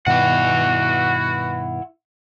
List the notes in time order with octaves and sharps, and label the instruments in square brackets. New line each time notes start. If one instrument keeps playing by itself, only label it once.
[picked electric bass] G2 B2 D#3 [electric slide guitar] E4 F#5 [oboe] F#4